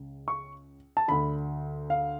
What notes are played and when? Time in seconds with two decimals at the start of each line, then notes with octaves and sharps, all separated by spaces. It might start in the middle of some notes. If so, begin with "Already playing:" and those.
Already playing: C#2 C#3
0.28 C#6
0.97 A5
1.08 D2 D3 B5
1.90 F5